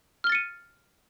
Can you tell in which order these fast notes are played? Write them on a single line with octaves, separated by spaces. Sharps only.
F6 G7 A6 C#7 D#7